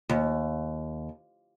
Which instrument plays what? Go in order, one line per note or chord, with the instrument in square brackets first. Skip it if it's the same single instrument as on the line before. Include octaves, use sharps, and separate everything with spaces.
[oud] D#2